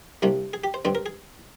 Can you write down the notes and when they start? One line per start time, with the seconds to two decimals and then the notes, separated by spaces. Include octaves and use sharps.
0.22 C2 C3 G3 A#3 D4
0.53 G#4
0.64 G4
0.74 C5
0.85 G2 D3 G#3 C4 D5
0.95 A#4
1.06 G#4